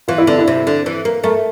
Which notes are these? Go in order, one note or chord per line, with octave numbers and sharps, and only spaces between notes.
E3 F4
E4
D3 D4
E4
C3
D3
E3
A#3
A3 A#4